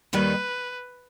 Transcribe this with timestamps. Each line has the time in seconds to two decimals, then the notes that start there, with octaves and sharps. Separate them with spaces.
0.13 D#2 D#3 G3 B4